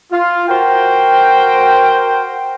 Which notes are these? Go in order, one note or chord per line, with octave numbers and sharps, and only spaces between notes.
F4
F#4 A#4 C5 G5